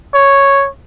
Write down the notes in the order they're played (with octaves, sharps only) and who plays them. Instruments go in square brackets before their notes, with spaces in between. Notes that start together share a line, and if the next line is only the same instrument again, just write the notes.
[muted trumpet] C#5